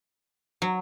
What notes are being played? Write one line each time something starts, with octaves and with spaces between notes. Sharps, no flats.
F#3